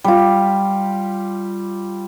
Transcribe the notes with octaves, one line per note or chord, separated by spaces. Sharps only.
G3 F4